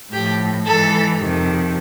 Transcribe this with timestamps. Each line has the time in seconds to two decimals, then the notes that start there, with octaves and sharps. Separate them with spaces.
0.12 A2 F3 G4
0.65 G#2 E3 A4
1.19 F2 C3 D#3